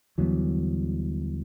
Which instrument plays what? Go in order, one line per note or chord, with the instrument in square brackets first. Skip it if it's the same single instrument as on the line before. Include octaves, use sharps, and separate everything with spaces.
[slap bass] D#2 D3 G3 B3 [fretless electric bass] E3 F#3